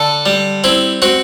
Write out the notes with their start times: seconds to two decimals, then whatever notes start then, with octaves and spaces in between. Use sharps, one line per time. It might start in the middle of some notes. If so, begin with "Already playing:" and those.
Already playing: D3 A4
0.26 G3
0.64 C4 E4
1.02 C4 F#4